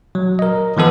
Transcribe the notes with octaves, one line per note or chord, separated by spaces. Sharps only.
F#3
A#4 D#5
D#3 F3 B3 A4 B4